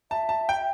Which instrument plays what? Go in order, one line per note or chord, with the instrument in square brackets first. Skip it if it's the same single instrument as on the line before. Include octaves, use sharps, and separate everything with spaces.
[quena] E5 [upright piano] A5
[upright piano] A5
G5